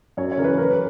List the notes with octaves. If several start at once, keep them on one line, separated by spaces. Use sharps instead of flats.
F#2 C#5
C#5
C#3 E3 A#4 B4
C#3 A#4
B4